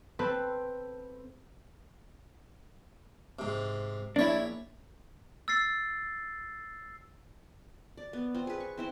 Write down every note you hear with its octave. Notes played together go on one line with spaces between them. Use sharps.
C4 A4 B4
G#2 C3
A#1 D4 E4 C#5
E6 A6 C7
D5
B3
C4 F4
G#4 B4
C#6
C4 E4 C5